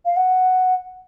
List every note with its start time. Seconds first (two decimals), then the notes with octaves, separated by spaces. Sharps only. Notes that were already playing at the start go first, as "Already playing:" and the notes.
0.05 F5
0.17 F#5